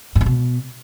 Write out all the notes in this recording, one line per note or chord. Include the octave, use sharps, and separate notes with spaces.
G#2
G2
B2